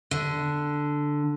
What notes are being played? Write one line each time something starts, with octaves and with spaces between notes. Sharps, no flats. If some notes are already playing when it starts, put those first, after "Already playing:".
D3